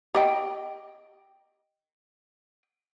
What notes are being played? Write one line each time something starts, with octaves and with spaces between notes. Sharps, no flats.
G4 D#5 G5